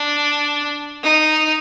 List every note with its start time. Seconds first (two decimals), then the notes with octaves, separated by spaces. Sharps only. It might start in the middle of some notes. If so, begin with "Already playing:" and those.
Already playing: D4
1.04 D#4